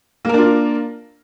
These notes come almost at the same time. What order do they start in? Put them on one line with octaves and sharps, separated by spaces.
A#3 A#4 D4 F4